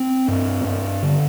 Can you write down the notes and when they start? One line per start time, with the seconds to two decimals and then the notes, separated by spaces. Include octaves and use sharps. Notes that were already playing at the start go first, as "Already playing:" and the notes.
Already playing: C4
0.28 G2
0.65 G2
1.02 D3